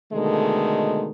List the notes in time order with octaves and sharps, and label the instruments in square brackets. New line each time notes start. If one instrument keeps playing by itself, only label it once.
[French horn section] B2 D3 D#3 G#3 A3